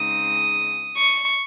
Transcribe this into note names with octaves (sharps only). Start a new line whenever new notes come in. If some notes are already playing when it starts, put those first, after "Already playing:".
Already playing: C#3 G#3 C4 D#4 D#6
C#6